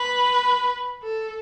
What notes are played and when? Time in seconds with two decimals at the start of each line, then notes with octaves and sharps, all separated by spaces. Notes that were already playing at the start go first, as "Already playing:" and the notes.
Already playing: B4
1.02 A4